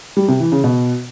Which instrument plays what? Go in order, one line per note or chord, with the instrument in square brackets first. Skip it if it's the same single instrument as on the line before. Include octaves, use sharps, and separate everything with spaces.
[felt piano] G3
C3
E3
C#3
B2